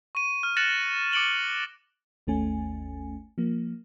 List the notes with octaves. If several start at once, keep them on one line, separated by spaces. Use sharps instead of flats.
C#6 D#7
F6
F#6 A6 A#6 C#7 E7 F#7
D6 C#7 D7 F#7 G7
G#1 D#2 A3 C#4 G#5
F3 A#3